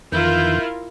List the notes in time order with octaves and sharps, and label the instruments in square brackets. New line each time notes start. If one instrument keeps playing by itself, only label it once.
[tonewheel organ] F2 D#3 E3 [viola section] E4 F4 A#4 [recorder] G6